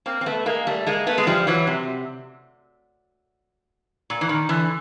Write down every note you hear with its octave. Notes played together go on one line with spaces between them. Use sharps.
A#3 C4
C4
A3 B3
G#3 A#3
G3 A3
G#3 A#3
A3 B3
G#3
F3 G3
E3 F#3
C3
A#2
E3
D#3
D3 E3